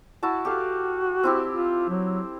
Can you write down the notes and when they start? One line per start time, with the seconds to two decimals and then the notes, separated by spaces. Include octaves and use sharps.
0.23 E4 F#4 A5
0.45 F#4 G4 A4 F5
1.23 C4 E4 G4
1.50 F4
1.89 F#3